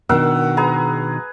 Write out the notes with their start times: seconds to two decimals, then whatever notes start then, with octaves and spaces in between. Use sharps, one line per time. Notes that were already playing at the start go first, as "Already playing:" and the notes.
0.09 B2 D#3 D4 A#4 F#5 E6
0.57 G#4 B4 A#5